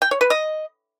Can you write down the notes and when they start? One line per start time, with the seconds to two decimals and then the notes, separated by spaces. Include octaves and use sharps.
0.02 G5
0.11 C#5
0.21 B4
0.30 D#5